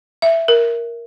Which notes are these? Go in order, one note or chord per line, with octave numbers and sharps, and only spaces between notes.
E5
A#4